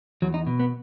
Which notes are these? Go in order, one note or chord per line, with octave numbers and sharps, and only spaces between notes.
E2 F#3
D#4
B2
B3